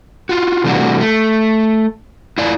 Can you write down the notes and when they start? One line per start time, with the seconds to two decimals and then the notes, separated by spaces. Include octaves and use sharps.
0.29 F4 F#4
0.64 C3 E3 G3 A3 D4 F#4
1.01 A3
2.38 E4 F4 D5